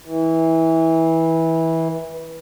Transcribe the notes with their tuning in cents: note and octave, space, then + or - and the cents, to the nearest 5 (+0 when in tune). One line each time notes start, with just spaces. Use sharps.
E3 -20